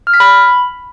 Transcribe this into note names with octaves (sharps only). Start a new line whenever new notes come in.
F6
B6
B5